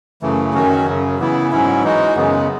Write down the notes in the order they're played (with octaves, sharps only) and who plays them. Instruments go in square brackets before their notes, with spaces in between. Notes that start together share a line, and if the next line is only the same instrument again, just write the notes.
[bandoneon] F#2 C#3 E3 A3
F#2 D#3 F#3 C#4 F#4
F#2 C#3 F#3
C#3 E3 B3 E4
G#2 F#3 C#4 E4
E3 G#3 D#4 F#4
F#2 C#3 G#3 B3